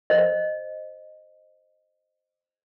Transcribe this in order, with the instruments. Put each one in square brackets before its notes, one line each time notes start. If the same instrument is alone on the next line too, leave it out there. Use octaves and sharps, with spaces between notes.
[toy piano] C5 D#5